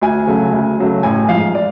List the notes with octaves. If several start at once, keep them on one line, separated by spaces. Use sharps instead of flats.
D2 G#5
C#3 F#3 A3
D2
C#3 F#3 A3
A1 G#5
G#2 F3 F5
D5